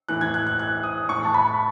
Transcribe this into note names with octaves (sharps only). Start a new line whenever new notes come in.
A2 E3 F#6
G#6
F#6
F#6
F#6
D#6
A2 E3 C#6
A5
B5